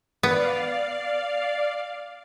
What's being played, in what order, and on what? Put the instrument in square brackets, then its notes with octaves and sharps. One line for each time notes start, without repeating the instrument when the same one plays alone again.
[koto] B3 [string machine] D5 F5